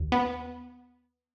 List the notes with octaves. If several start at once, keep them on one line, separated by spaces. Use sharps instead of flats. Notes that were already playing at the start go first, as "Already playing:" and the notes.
Already playing: D#2
B3